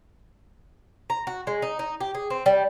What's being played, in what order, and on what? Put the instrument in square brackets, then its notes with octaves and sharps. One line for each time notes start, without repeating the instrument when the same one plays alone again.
[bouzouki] A#5
F#4
G#3
D#4
D#4
G4
G#4
C4
G3